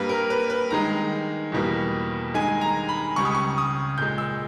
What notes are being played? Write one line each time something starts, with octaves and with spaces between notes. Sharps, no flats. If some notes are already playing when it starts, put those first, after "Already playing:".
Already playing: G2 G3 A#3 B4
A#4
B4
B4
G2 D#3 G#3 A#5
E2 B2 G3 A#3
G2 D#3 G#3 G#5
A#5
B5
C#2 C#3 G3 C#6
D#6
C#6
D#6
A#2 G#3 G6
E6